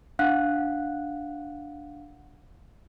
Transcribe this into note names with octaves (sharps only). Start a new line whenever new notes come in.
D4 F5 F#5 F#6